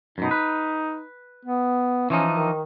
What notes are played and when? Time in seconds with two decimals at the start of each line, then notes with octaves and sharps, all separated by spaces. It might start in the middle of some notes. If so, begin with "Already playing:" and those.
0.18 F#2 B2 D#4
0.31 B4
1.45 B3
2.10 E3 F3 C#4 D#4
2.30 D#3